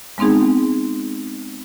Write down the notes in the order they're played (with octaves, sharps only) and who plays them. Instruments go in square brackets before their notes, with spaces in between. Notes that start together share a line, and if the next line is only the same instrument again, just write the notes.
[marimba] G#3 B3 C4 D#4 G#4